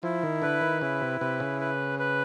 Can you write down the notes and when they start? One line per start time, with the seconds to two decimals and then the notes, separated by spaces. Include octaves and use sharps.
0.03 F3 E4
0.23 D#3
0.42 D3 B4
0.61 D#3
0.81 C#3 E4
1.01 C3
1.20 C3 B4
1.40 C#3
1.60 B4
1.99 B4